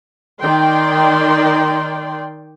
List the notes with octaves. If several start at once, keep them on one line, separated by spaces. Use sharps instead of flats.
D#3 D5 G5 C6